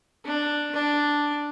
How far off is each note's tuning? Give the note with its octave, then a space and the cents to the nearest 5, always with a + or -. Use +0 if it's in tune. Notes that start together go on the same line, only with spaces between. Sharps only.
D4 +5
D4 +0